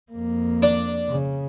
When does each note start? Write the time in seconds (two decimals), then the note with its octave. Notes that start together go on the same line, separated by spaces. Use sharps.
0.11 F2 A#3
0.62 D4
1.09 C#3